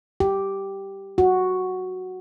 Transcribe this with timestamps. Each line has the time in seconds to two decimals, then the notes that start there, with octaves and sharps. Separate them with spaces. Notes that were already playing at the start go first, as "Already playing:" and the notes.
0.20 G4
1.18 F#4